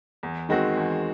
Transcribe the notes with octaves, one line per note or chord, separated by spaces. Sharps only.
E2
D#3 G#3 C4 F#4
E2